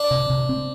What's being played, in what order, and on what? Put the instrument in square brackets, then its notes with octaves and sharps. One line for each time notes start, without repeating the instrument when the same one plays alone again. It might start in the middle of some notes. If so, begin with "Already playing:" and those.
Already playing: [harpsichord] D4
[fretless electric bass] C3
C3
C4